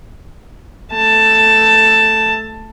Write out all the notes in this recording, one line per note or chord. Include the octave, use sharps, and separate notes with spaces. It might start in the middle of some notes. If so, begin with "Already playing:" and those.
A3 A5